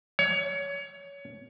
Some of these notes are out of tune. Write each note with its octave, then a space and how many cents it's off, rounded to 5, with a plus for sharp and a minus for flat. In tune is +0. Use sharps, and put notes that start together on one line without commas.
C#5 +20